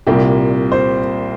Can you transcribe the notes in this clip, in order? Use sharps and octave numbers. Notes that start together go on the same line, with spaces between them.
C2 A#2 G3 A#3 G4
C5